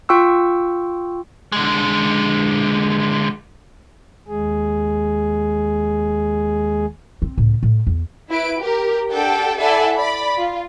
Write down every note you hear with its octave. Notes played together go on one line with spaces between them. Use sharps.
F4 G5 C#6 E6
D3 G#3
D#2 G#3 G#4
C4
C#2 A2
A2
E2
E4 B4 D7
G4 A#4
D4 G4 A4 F#5 G5
E4 A4 D5 E5 F#5 G#5
D5 B5
F4